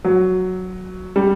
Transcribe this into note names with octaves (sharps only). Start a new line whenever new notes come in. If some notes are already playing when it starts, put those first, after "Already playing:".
F#3
G3